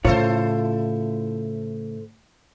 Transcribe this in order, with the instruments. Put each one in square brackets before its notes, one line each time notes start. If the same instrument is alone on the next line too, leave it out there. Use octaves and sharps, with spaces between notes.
[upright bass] A2 C#3 [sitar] E4 A4 C5 [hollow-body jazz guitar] F4 C#5